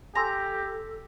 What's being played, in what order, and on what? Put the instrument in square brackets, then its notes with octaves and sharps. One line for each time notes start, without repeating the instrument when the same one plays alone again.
[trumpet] G4 [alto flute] A4 [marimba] G#5 C6 E6 [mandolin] A#5